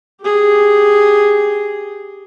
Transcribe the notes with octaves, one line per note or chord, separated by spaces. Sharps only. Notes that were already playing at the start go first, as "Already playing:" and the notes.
G4 G#4